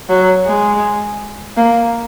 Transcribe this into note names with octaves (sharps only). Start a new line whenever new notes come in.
F#3
G#3
A#3